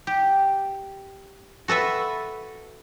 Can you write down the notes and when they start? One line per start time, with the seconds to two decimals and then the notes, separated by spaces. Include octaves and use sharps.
0.07 G4
1.68 F#4 A4 B4 E5